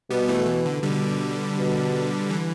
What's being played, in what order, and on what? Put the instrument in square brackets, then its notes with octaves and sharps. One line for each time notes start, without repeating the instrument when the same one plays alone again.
[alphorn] B2 [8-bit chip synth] G3 B3
[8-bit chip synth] E3 A3
E3
D3
[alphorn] B2 [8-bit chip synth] D3 G3
[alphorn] B2
[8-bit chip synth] E3